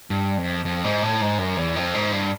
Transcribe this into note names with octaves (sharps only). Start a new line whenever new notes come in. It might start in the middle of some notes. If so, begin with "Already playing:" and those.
G2
F2
F2
G#2
A2
G#2
F#2
E2
F2
G#2
G2